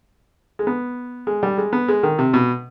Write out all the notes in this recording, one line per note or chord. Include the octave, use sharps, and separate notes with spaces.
G#3
B3
G#3
G3
G#3
B3
G#3
D#3
C3
B2